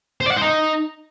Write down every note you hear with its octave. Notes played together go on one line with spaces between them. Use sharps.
C5
D5
F#5
C5
D#4